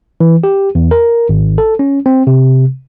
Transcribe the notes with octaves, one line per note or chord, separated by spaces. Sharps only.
E3
G4
E2
A#4
G#1
A4
C#4
C4
C3